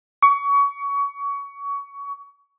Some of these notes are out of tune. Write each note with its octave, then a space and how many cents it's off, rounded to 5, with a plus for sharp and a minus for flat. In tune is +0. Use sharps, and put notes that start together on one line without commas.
C#6 +25